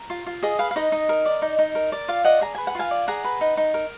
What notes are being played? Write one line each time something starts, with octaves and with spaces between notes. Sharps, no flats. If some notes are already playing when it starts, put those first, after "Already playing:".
Already playing: A#5
F4
F4
G#4 D#5
B4 F5
F5
D#4 D#5
D#4
A#4
D5
D#4
D#4
A#4
D5
F4 F5
D5 D#5 F#5
G#4 A#5
B4 G#5
F#5
F4 F5 G#5
D5
G#4 F#5 A#5
B4
D#4
D#4
A#4